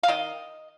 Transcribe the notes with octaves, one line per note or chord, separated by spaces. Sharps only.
F5
D#3 D#5